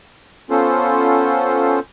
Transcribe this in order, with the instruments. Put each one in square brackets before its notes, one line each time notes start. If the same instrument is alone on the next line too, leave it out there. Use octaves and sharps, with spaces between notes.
[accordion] B3 C#4 F4 A4 C5